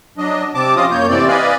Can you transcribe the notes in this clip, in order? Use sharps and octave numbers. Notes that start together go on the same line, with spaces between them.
F#3 D4 D#5
C3 C4 A5 D6
F3 C#4 F4 D#5 F5 D#6
F#2 A#3 C#5 G6
A2 C3 E3 C4 D5
B4 D5 D#5 F5 G#5 B5